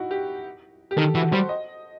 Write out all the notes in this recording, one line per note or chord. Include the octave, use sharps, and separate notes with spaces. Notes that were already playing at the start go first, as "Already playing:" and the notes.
Already playing: D#4 E4 F#4
G4
G4
D#3 A4
E3 F#4
G3 C5
D#5